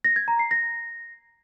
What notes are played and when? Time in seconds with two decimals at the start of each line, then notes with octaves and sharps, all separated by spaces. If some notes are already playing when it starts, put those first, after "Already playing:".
0.04 A#6
0.16 G#6
0.28 A#5
0.39 C7
0.51 A#6